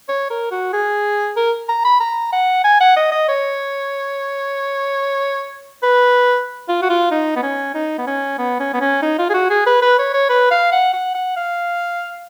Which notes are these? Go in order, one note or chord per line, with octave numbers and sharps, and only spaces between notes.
C#5
A#4
F#4
G#4
A#4
A#5
B5
A#5
F#5
G#5
F#5
D#5
D#5
C#5
B4
F4
F#4
F4
D#4
B3
C#4
D#4
B3
C#4
B3
C#4
B3
C#4
D#4
F4
G#4
F#4
G#4
B4
B4
C#5
C#5
B4
F5
F#5
F#5
F#5
F5